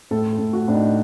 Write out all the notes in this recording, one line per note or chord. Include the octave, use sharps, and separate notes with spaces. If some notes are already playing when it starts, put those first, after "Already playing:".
A2 A4
A4
A2
F#4
A2 D4
D#4